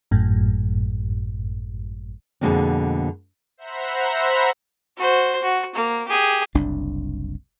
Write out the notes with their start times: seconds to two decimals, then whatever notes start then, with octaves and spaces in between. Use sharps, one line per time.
0.11 G#1 F#2 A2
2.41 F2 B2 D3 G#3 A#3 C4
3.57 C5 E5 F#5 A#5 B5
4.97 F#4 C5
5.42 F#4
5.75 A#3
6.08 G4 G#4
6.54 F#1 C2 D4